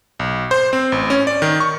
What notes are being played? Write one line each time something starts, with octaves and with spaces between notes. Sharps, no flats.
B1
C5
C4
A1
C#4
D5
D#3
C#6